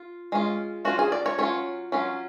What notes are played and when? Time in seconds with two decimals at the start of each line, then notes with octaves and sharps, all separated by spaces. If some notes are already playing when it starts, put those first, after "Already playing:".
Already playing: F4
0.32 G#3 C#4 F4
0.85 F#3 C#4 F4 F#4
0.99 G#4
1.12 D5
1.26 C#5
1.38 F#3 C#4 F4 C#5
1.92 F#3 C#4 F4